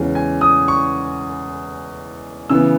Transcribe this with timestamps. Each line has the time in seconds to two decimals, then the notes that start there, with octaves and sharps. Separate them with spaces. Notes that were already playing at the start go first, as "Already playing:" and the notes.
Already playing: E2 C#3 G#3 C#4
0.15 G#5
0.41 D#6
0.68 C#6
2.50 C#3 E3 B3 E6